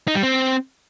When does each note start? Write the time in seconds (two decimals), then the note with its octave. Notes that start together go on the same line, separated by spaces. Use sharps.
0.08 D#4
0.15 G3
0.23 C4